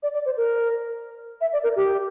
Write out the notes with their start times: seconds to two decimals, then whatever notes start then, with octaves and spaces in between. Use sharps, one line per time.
0.03 D5
0.14 D5
0.25 C5
0.37 A#4
1.41 E5
1.53 D5
1.63 A#4
1.76 G4